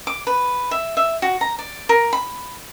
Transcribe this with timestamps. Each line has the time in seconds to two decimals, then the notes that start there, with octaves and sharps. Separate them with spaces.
0.07 D6
0.27 B4
0.71 E5
0.97 E5
1.22 F#4
1.41 A#5
1.59 D5
1.89 A#4
2.13 B5